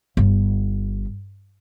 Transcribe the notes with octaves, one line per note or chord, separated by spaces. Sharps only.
G1